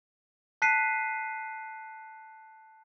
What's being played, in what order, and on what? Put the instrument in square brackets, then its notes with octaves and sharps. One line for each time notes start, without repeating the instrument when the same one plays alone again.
[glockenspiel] A5 F#6 B6 C7 D#7